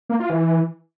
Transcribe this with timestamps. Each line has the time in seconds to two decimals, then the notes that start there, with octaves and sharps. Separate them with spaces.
0.09 A#3
0.20 F4
0.30 E3